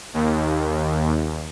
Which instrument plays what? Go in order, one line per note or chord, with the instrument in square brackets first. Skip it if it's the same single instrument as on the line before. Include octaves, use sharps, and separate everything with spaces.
[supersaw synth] D#2